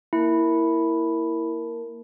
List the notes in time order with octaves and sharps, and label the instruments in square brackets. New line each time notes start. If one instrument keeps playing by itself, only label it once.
[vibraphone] A#3 A#4 A5 [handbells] E4